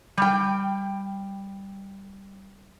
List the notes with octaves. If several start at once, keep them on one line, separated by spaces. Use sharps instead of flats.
G3 G5